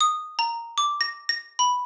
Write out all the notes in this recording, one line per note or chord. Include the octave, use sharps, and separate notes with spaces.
D#6
A#5
D6
A#6
A#6
B5